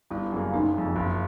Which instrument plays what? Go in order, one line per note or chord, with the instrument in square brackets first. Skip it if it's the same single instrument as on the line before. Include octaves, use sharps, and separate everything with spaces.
[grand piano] G1 [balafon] E4
[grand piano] F#2 C#3 F#3 A#3
[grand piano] F#1 [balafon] D#4
[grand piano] F2 C#3
F#1